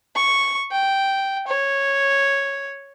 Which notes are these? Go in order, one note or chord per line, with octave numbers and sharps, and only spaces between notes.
C#6
G5
C#5